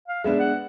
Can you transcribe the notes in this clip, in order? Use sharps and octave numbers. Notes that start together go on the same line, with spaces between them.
F5
G#3 B3 D4 E5
F#5